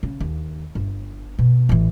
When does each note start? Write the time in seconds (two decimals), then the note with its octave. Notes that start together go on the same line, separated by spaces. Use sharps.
0.03 C#3
0.20 D#2
0.75 G1
1.39 B2
1.69 A1 E3